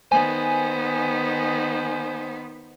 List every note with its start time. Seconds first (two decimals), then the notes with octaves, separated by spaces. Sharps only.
0.12 D#3 B3 C5 G#5